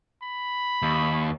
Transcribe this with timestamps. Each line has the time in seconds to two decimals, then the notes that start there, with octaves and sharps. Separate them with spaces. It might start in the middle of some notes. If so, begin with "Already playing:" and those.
0.23 B5
0.82 D#2